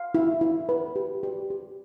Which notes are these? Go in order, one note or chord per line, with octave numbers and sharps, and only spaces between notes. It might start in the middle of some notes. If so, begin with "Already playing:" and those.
Already playing: F5
E4
E4
B4
G4
G4
G4